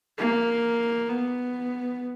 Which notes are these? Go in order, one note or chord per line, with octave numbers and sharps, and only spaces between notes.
A#3
B3